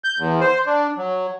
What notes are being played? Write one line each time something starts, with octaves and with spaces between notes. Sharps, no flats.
G6
E2
C5
D4
F#3